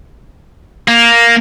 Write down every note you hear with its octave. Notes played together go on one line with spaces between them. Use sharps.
A#3